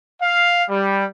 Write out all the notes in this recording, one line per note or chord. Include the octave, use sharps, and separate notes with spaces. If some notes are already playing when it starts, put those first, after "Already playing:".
F5
G3